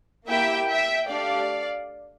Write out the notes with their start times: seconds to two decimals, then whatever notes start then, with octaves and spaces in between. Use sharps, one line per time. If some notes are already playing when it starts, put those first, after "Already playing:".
0.28 A#3 E4 G4 E5 G5
0.68 E5 G5
1.08 A3 D4 G4 D5 F5